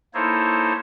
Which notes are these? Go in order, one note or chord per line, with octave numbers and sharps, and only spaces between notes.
A#3 D#4 E4 A4 C5 C#5